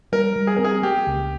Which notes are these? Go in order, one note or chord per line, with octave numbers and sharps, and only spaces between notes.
G3 A#4
G3
G#4
C4 A#4
G#4
A#3 G4
C#2